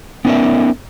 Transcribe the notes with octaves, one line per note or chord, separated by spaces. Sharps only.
B3 C#4 D#4 A#4 D5 E5